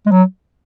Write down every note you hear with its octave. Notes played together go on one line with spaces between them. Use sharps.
G#3
F#3